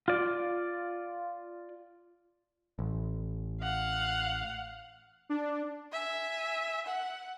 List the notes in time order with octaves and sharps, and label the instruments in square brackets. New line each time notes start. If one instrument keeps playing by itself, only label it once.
[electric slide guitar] F4 D5
[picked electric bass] A1
[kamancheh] F5 F#5
[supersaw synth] D4
[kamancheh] E5 G#5
F#5